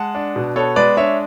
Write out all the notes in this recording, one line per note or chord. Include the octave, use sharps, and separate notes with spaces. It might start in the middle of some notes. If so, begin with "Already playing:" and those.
Already playing: G#3 F#5 A5
D4
B2
B3 A4 C#5
G#3 B4 D5
D4 C#5 E5